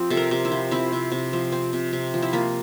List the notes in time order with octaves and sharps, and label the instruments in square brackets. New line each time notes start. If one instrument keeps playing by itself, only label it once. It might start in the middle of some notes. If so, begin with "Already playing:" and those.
Already playing: [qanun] F3 C4 G4
C3 A4
A#4
C3
E4
F3
C4 E4
C3
C3
F3
C4
C3
C3
F3
E4
A#3 F4